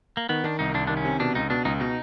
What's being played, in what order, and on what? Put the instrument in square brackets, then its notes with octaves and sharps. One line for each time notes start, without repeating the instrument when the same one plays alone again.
[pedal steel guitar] A#3
[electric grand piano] D#3 [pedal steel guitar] B3
[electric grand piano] D#3 [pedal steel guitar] D4
[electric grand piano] C2 [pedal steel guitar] D#4
[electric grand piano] C2 [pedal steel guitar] D4
[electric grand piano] D#3 [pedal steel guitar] D4
[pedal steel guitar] C#4
[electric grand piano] C3
[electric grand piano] B2 [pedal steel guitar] D4
[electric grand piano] C#2 [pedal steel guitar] D#4
[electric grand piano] B2 [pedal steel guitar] D4
[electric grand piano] C#2 [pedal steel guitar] D#4
[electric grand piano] B2 [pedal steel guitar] D#4